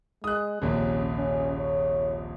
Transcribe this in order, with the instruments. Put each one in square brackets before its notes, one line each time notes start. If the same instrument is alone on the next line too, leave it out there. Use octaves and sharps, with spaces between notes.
[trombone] G#3 [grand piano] D#6 F#6
[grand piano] D#1 A#1 C3 [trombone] C#4
[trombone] C#4
C#5